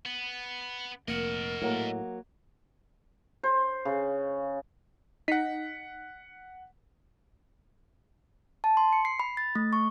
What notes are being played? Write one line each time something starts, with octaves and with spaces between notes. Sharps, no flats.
B3
F1 A#3 A#4 D#5 F#5
A2 F#3 A#3
C5
C#3
D#4 F#5 B6
A5
C6
C#7
C7
B5
A6
A3
C#6